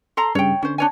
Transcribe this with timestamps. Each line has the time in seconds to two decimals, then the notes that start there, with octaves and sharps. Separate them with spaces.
0.17 A4 A#5 C6
0.35 G2 C#3 C#5 G5
0.62 D3 C#4 C5
0.78 D4 C#5 G#5